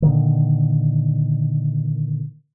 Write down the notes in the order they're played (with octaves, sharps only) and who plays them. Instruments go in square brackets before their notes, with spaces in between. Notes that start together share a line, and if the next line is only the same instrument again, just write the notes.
[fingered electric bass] A#2 D3 D#3